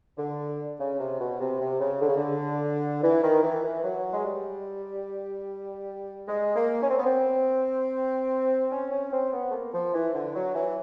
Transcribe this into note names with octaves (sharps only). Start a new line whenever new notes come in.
D3
C#3
C3
B2
C3
C3
C#3
D3
C#3
D3
E3
D#3
E3
E3
F#3
G#3
G3
G#3
A#3
C#4
C4
B3
C4
C#4
C#4
C4
B3
A3
A#3
F3
E3
D3
F#3
E3